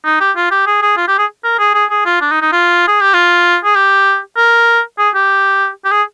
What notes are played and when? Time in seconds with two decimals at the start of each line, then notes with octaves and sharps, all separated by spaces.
0.05 D#4
0.21 G4
0.36 F4
0.51 G4
0.67 G#4
0.82 G#4
0.97 F4
1.08 G4
1.18 G#4
1.44 A#4
1.59 G#4
1.74 G#4
1.90 G#4
2.06 F4
2.21 D4
2.31 D#4
2.42 D#4
2.52 F4
2.88 G#4
3.01 G4
3.14 F4
3.64 G#4
3.75 G4
4.37 A#4
4.99 G#4
5.15 G4
5.85 G4
5.91 G#4